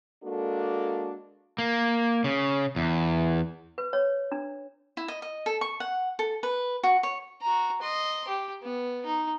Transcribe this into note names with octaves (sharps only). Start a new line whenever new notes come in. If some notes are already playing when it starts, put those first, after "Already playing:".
G#3 A#3 D4 F#4 A4
A#3
C#3
E2
B4
C#5
D4
E4
D#5
D#5
A4
C#6
F#5
A4
B4
F#4
C#5
F#4 A#5
D#5 C6
G4
B3
D#4